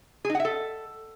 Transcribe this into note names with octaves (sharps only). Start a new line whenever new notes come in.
G#4
D#4
F#5
E5
A4